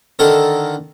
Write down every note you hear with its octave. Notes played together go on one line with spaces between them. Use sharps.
D3 D#3 A4 A#4